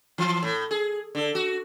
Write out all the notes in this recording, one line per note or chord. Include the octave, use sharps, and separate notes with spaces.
E3
A2
G#4
D3
F#4